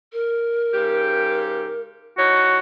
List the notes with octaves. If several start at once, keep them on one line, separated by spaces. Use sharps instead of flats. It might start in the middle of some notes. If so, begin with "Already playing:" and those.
A#4
G#2 C#3 G4
E3 D#4 F#4 C#5